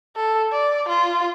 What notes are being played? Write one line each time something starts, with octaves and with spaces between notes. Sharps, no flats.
A4
D5
F4